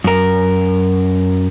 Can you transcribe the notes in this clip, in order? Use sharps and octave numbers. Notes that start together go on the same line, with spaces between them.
F#2 A#4